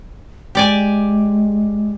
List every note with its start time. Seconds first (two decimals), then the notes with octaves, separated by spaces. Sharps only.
0.55 G#3 G4 D5 G#5